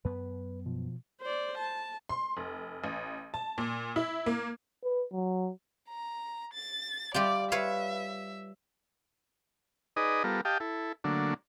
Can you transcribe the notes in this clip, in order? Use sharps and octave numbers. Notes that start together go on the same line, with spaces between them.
F#2 B3 B4
B2 F3
C5 D5
A5
C6
F1
A1
A5
A#2
E4
A#3
B4
F#3
A#5
A6
G3 F4 G4 D5
B4 C#5 E5 F5
D#4 G#4 B4 D5 D#5
G3 B3 F4 A4 A#4
G4 D#5 F5 G5 A5
E4 A4
D3 F#3 A3 A#3 D4